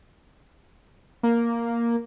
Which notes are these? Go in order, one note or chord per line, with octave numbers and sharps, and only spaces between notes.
A#3